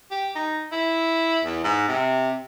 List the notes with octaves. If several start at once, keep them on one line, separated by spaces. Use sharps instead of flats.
G4
D#4
E4
E2
G#2
C3